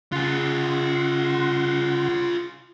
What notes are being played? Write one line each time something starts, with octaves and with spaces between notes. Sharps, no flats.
C#3 F4 G#4 F#5 C6